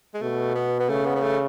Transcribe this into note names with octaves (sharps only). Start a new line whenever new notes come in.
G#3
B2 A3
B3
B3
C#3 A3
B3
B3
A3